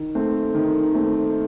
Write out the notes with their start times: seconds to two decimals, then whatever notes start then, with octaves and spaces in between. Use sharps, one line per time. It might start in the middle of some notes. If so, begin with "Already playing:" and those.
Already playing: D#3
0.15 A3 C4
0.55 D#3
0.94 A3 C4